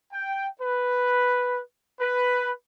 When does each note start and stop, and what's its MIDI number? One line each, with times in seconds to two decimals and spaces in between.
0.12 0.48 79
0.62 1.61 71
2.00 2.51 71